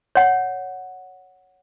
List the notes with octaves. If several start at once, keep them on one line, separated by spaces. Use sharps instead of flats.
C#5 F#5